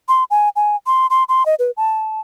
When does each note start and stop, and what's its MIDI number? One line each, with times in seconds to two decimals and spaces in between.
0.08 0.24 84
0.31 0.49 80
0.56 0.76 80
0.87 1.06 84
1.10 1.24 84
1.29 1.46 84
1.46 1.55 75
1.59 1.71 71
1.77 2.21 81